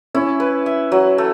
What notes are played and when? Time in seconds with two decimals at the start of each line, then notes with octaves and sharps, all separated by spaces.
0.14 C#4 E4
0.40 B4
0.66 E5
0.92 F#3
1.18 A3